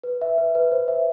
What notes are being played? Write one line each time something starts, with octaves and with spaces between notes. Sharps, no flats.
B4
E5
B4
B4
C5
E5